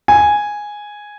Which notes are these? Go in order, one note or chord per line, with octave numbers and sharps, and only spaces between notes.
G#5